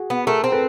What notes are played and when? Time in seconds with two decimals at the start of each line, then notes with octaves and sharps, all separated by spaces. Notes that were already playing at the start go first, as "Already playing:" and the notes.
Already playing: F#4 G#4
0.10 B3
0.27 A3 G#4 A#4
0.44 C4
0.52 A4 B4